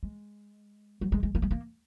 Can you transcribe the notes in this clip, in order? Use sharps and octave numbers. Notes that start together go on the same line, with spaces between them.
G#3
F#3
G#3
G#3
A#3
G#3
A#3